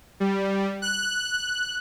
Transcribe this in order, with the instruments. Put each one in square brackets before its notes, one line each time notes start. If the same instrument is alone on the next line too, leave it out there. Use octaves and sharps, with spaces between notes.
[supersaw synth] G3
F#6